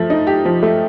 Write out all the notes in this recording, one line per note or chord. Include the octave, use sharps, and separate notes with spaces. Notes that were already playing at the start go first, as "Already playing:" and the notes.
Already playing: F3 A3
D#4
G4
F3
A3